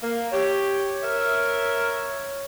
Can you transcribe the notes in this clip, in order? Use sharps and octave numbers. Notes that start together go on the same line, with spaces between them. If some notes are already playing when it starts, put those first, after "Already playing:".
A#3
G4 C#5
A#4 E5